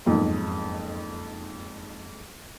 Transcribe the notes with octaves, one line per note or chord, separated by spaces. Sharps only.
F#1 B1 F2 G#2